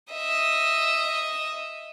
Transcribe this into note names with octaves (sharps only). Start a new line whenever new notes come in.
D#5 E5